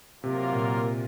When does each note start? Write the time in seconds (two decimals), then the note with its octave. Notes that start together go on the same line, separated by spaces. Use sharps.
0.23 C3 F#3 A#3 F4 A#4
0.52 A#2